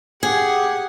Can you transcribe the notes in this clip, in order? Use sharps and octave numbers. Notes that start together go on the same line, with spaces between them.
G4 G#4 F#5